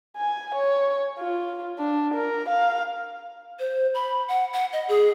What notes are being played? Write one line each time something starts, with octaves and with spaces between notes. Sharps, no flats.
G#5
C#5
F4
D4
A#4
F5
C5
B5
F#5
F#5
D#5
G#4